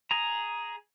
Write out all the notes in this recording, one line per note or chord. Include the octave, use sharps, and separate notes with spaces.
G#4 A#5